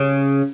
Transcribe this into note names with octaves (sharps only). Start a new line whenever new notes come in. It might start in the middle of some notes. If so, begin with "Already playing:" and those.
Already playing: C#3